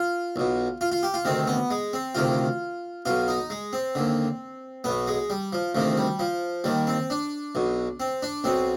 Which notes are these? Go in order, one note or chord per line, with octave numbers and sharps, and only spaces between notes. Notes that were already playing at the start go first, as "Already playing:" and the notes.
Already playing: F4
B1 B2
F4
F4
G4
F4
D2 C3 D#3 C4
B3
G#3
C4
D2 C3 D#3 F4
B1 B2 F4
D#4
G#3
C4
D#2 D3
B1 B2 B3
G#3
G3
F3
D2 C3 D#3 F3
G3
F3
D#2 D#3 G3
C4
D4
B1 B2
C4
D4
B1 B2 C4